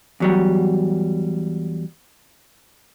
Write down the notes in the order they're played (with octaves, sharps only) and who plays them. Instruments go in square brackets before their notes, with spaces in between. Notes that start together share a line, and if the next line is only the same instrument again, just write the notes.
[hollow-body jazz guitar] E2 F#3 G3